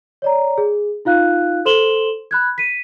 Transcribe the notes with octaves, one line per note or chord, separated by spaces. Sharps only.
C#5 D5 A#5
G#4
D#4 F4 F5 F#6
A4 C5 C6 E7 F#7 G7
B5 F#6 G#6
B6 D#7